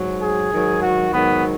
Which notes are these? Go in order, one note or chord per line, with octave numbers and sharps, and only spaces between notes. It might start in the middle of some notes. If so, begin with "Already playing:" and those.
Already playing: G#2 F#3
G#4
G#2 D#3 F#3
F#4
G#2 D#3 F#3 B3